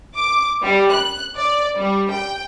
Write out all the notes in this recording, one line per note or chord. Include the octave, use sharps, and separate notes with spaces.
D6
G3
F#6
D5
G3
G5